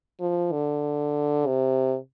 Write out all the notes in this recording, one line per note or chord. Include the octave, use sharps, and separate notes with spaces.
F3
D3
C3